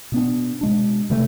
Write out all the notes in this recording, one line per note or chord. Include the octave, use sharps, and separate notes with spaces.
B2 B3 D4
B2 G#3 D4
C3 E3 A3